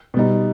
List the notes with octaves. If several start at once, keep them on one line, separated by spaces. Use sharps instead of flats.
B2 G3 D#4